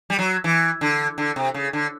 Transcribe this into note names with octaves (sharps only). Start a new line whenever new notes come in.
G3
F#3
E3
D3
D3
C3
C#3
D3